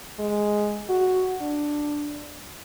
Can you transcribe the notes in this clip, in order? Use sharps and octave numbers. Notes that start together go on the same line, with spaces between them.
G#3
F#4
D4